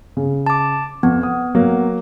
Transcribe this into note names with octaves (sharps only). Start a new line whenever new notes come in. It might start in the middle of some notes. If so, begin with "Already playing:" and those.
C#3
A5 D6
F2 B3
D#6
F#3 A#3